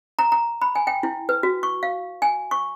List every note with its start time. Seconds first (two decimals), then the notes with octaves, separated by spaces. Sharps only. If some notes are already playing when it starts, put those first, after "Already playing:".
0.19 A#5
0.32 A#5
0.62 B5
0.75 G#5
0.87 G5
1.03 E4
1.29 B4
1.43 F#4
1.63 C#6
1.83 F5
2.22 G#5
2.51 C#6